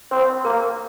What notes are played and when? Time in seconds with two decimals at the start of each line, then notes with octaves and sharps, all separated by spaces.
0.11 C4 C5
0.45 A#3 A#4